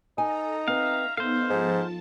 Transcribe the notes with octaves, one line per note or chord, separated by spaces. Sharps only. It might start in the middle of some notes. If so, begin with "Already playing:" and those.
D#4 A4 G#5 A#5
C4 B4 E5 F5 A#5
B3 D#4 A4 C5 F5
G#2 F3 A5